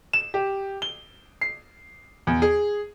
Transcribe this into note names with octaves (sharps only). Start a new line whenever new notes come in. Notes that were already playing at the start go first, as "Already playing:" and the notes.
E7
G4
G7
C7
E2
G#4